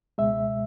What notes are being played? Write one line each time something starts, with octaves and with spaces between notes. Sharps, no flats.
C#2 B2 G#3 E5